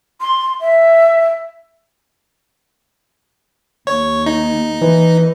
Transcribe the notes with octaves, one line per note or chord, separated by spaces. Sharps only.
C6
E5
D#2 C#5
D#4
E3